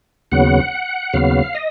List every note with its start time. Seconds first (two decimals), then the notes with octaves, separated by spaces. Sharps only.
0.32 D#2 C#3 F#3 B3 F#5
1.13 D#2 C#3 F#3 B3 F5
1.55 D#5